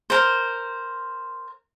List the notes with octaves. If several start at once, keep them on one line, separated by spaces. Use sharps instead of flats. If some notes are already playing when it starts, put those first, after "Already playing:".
A#4 C5